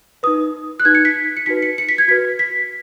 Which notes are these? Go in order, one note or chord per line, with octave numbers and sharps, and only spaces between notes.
D#4 B4 D#6
F#6
D#4 B4 G#6
C#7
B6
C#7
D#4 F#4 B4 B6
C#7
C#7
B6
G#6
F#4 B4 B6
B6